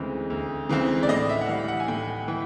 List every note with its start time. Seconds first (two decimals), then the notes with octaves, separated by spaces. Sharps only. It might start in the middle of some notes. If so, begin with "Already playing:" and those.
Already playing: D2 C#3 E3 G#3 C4
0.30 D2
0.69 C#3 E3 G#3 C4
1.03 D5
1.09 A2 D#5
1.29 E5
1.41 F#5
1.48 E3 G3 F5
1.68 F#5
1.80 G#5
1.88 A2 G5
2.28 E3